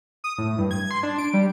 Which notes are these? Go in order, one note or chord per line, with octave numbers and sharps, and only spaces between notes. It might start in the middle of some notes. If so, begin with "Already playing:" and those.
D#6
A2
G2
G#6
C6
D4
D7
G3